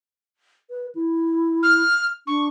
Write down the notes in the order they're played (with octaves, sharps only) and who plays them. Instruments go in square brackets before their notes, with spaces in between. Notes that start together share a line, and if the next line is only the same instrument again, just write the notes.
[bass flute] B4
E4
[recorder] F6
[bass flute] D4 [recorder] C#6